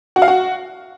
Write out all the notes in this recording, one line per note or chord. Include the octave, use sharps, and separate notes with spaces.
F#4
F5
F#4